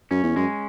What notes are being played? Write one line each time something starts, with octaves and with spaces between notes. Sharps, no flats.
F#2 C#4
E2
F#2 G#3